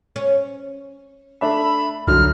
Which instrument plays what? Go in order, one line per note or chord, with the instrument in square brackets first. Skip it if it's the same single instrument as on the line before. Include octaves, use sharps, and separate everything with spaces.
[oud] C#4
[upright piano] A3 D4 E5 [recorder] B5
[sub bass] C2 [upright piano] F#2 D3 F#3 [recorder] F6